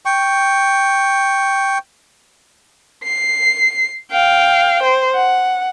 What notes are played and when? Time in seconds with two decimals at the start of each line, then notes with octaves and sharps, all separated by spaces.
0.06 G5 C#6
3.04 C7
4.11 F5 G5
4.83 C5
5.14 F#5